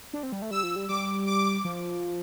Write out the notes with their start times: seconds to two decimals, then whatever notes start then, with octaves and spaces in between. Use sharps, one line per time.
0.13 D4
0.23 C4
0.32 G3
0.42 A3
0.51 G3 E6
0.63 F3
0.76 G3
0.88 G3 D6
1.26 D6
1.65 F3